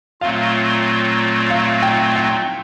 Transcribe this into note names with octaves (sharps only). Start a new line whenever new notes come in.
A#2 F#3 A3 C4 F4 F5
F5
G5
G5